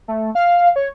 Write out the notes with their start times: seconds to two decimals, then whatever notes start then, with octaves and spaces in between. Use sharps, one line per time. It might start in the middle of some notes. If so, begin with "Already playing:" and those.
0.08 A3
0.35 F5
0.76 C#5